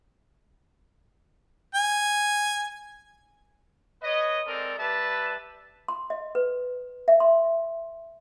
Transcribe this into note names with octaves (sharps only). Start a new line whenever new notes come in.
G#5
B4 C#5 D#5
G#3 C4 A4 A#4 D5
G3 B4 E5 A5
C6
D#5
B4
E5
C6